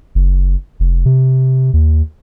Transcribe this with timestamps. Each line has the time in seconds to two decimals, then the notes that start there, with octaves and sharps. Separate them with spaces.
0.15 F#1
0.80 F1
1.05 C3
1.74 D#2